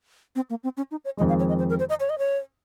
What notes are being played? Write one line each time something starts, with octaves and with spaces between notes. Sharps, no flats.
C4
A#3
C4
C#4
D#4
C#5
F2 D#3 G#3 D#5
F5
C#5
D#5
C5
A#4
C5
D#5
C#5
D#5
C#5